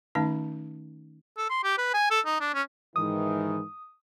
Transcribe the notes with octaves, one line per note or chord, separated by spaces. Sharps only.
D#3 A3 C#4 D#4 F5 A5
A4
C6
G4
B4
G#5
A4
D#4
D4
C#4
G#2 D#3 E3 D#6